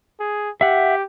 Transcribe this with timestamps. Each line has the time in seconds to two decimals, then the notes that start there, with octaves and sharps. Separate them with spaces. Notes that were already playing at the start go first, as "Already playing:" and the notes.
0.20 G#4
0.61 G4 E5 F#5